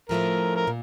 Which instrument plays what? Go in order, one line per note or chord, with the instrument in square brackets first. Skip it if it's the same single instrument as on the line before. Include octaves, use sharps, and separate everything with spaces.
[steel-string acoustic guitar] A2 F3 A3 C#4 F4 [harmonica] A#4
[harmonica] A#4
[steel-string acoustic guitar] A#2